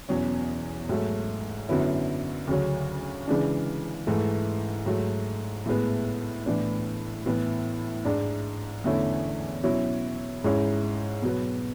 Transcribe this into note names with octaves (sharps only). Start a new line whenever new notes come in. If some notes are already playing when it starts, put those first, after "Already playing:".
E2 B2 F#3 C#4
G#2 F#3 A3
F#2 D3 F#3 B3 E4
D2 C#3 F#3 C#4
C#3 E3 G#3 D4
G#2 E3 A3
G#2 F#3 A3
A2 G#3 B3
A2 E3 B3 D4
A2 E3 B3
G#2 G#3 D4
E2 D3 A3 C#4 E4
B2 F#3 C#4 E4
G#2 G#3 C#4 E4
B2 F#3 B3